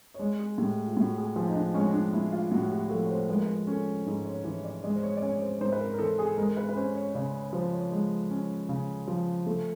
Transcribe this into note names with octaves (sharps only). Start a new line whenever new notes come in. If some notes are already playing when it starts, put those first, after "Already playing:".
C#5
G#3 D5
G#4
A2 G4
F4
A2 F#4
G#4
F3 G#4
D#4
D4
G#3 C#4
D4
A2 E4
F4
A2 F#4
G4
F3 A4
C#5
C5
G#3 B4
A#4
B4
C#4 A4
G#2 G#4
C#5
E3 C#5
D5
G#3 D5
C5
C#5
D5
C#4 C#5
C5
G#2 C5
B4
A#4
A#4
E3 A4
G#4
G#3 A#4
B4
B4
C#4 C5
C#5
C#3 D5
C#5
F3 C5
C#5
G#3
C#4
C#3
F3
A3